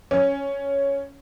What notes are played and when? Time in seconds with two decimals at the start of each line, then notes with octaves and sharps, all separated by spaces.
0.11 C#4